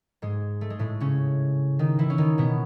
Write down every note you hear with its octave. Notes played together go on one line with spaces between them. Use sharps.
G#2 G#3
A3
G#3
A2 A3
C#3 C#4
D#3 D#4
E3 E4
C#4
D#3 D#4
B2 B3